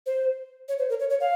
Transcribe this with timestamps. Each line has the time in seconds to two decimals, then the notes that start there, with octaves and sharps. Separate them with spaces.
0.06 C5
0.69 C#5
0.78 C5
0.89 A#4
1.00 C#5
1.10 C#5
1.20 F5